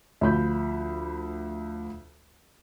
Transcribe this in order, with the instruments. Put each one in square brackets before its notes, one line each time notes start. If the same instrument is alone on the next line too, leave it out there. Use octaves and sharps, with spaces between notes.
[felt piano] D2 F3 B5 G6